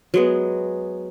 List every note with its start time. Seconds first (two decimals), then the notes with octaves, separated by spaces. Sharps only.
0.14 F#3 G#3 B3